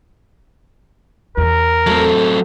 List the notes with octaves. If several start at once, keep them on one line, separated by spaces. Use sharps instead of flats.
E2 E3 A#4
F#3 A3 C4